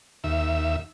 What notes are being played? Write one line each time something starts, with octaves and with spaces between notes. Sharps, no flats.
D#2 E5